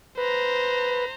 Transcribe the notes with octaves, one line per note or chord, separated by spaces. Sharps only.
B4 C5 A#5